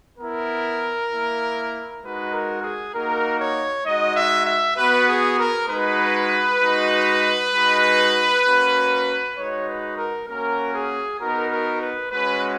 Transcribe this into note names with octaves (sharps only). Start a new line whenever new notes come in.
B3 E4 A#4
A#3 E4
G#3 D#4 F#4 B4
A#4
G#4
A#3 D#4 F#4 A#4
C#5
G#3 D#4 F#4 D#5
E5
E5
B3 F#4 B4
G#4
A#4
G#3 D#4 F#4 B4
G#3 D#4 F#4
G#3 D#4 F#4
A#3 C#4 F#4
G#3 D#4 F#4 C#5
B4
A#4
A#3 C#4 F#4 A#4
G#4
B3 D#4 F#4 A#4
A#4
B4
G#3 C#4 F#4 B4